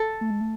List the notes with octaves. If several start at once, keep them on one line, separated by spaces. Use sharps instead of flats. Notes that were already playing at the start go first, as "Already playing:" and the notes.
Already playing: A4
A3
G#3
A3